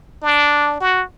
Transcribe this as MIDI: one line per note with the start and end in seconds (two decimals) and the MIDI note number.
0.23 0.77 62
0.81 1.03 66